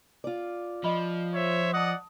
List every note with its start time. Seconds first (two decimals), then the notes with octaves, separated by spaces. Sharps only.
0.24 F4 D5
0.84 F3 D#5 B5
1.34 C5 C#5 E5
1.73 D5 D#5 F#5 A5 D#6